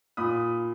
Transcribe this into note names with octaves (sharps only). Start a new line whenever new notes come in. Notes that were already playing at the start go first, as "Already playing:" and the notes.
A#2 B5 D#6